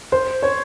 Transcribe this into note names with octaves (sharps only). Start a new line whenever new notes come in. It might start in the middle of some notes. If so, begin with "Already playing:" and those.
C5
C#5